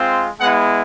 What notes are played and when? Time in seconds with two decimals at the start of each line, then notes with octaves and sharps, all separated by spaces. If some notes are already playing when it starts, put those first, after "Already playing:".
Already playing: G#3 C4 F4
0.40 G#3 B3 E4 F#5